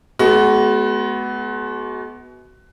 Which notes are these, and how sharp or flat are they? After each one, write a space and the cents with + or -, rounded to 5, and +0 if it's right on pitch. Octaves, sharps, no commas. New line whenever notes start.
G#3 +45 B3 +0 F#4 +20